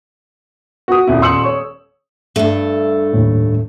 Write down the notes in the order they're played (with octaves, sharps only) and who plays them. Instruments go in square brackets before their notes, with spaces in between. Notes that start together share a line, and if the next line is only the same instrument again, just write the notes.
[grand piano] F#4 D#6
D#1 E4
D#1 C6 E6 C#7 F#7
C#5 C#6
[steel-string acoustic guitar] G2 A3
[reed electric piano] D#2 A2